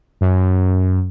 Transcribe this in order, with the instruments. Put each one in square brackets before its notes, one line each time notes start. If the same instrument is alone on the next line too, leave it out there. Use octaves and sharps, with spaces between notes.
[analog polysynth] F#2